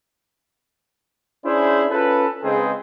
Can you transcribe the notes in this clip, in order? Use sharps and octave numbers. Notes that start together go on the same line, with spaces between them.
C#4 D4 E4 G#4 C5
C#4 F4 A4 B4
C#3 G#3 C4 D#4 G#4 B4